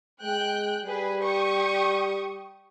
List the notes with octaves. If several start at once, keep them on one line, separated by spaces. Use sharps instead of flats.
G#3 G5 F#6
G3 G#4 B4
G4 C#6 D#6